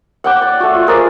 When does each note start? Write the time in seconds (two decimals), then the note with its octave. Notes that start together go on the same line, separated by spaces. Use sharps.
0.24 F#5 G5 D6
0.42 D5
0.60 A3 F#4
0.74 F4
0.87 G#4 A#4 C5 D5